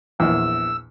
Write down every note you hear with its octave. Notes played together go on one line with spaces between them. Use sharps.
A#1 E2 E6